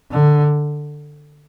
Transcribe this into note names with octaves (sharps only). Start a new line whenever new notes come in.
D3